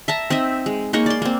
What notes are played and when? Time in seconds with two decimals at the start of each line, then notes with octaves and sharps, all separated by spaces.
0.08 E5 A5 A#5
0.30 C4 D#4 D#5 E5
0.66 G#3
0.93 G#3 A#3 D#4 C#5
1.06 D5 C6
1.22 A#3 C4